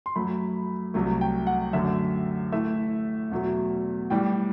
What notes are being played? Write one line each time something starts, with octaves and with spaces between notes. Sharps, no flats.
C6
F#2 F#3 A3 B5
C2 C3 F#3 A3
G5
F#5
F#2 D3 A3 E5
A2 E3 A3 E5
E2 B2 F#3 A3
A2 E3 G3 G5